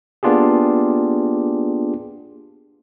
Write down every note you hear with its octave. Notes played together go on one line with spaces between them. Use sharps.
A#3 B3 D4 F4 G4 G#4